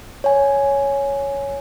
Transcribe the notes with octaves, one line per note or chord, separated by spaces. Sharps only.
C#5 G#5